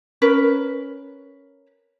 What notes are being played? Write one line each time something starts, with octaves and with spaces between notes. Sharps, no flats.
C#4 A#4 B4